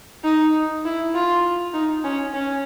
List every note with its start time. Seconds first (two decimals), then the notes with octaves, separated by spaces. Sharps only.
0.24 D#4
0.85 E4
1.14 F4
1.74 D#4
2.04 C#4
2.34 C#4